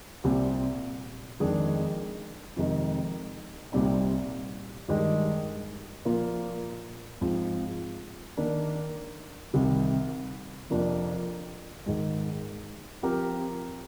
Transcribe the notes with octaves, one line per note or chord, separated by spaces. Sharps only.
C2 A#2 G3 C4
F2 D#3 G#3 D4 G#4
F2 C3 D#3 G#3 D#4
C2 A#2 G3 C4 D#4
G2 D#3 G#3
A#2 F3 A#3 F4
G#2 F3 C4 F4
D#3 A#3 D4
C2 C3 D#3
F2 C3 F3 A#3 D4
G#2 D#3 G#3
F3 C4 G4 A#4